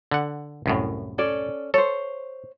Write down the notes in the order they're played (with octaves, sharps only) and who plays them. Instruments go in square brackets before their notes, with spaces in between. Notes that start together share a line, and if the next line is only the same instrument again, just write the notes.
[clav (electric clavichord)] D3 F#5
C2 F#2 A2
[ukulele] C#4 A4 D5
[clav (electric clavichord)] A4 [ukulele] C5 C#5